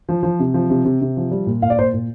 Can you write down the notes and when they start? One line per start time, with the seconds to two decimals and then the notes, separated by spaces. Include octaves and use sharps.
0.09 F3
0.23 F3
0.40 C3
0.54 F3
0.70 C3
0.85 C3
1.01 C3
1.17 F3
1.31 G3
1.47 A#2
1.62 A#2 F5
1.70 D5
1.78 A#2 C5
1.94 A#2